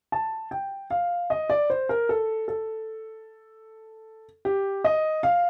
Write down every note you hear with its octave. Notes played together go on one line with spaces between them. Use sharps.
A5
G5
F5
D#5
D5
C5
A#4
A4
A4
G4
D#5
F5